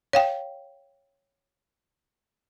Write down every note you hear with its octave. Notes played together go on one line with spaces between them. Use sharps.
C#5 F5 G5